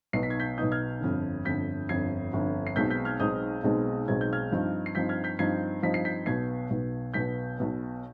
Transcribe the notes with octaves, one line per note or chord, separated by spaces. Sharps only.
B1 B2 B3 D#4 C7
B6
G#6
G6 B6
B1 B2 B3 D#4 D#6 G6
F6 G#6
G1 F2 D3
G1 F2 D3 G6 B6
G1 F2 D3 G#6 C7
G1 F2 D3
C7
B1 B2 G#3 C4 D#4 G6 B6
G6 B6
F6 G#6
B1 B2 G#3 C4 D#4 D#6 G6
B1 B2 G#3 C4 D#4
B1 B2 G#3 C4 D#4 G#6
G6
F6 G#6
G2 F3 C4 D#4
C7
G2 F3 C4 D#4 G6 B6
F6 G#6
G6 B6
G2 F3 C4 D#4 G#6 C7
G2 F3 C4 D#4 B6
C7
G6 B6
B1 B2 B3 G#6 C7
B1 B2 B3
B1 B2 B3 G6 B6
B1 B2 B3